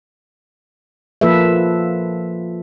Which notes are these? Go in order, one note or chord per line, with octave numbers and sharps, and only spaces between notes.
F3 A#3 F4 A4 B4 E5